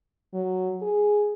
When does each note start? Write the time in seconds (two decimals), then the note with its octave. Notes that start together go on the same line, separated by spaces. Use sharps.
0.34 F#3
0.82 G#4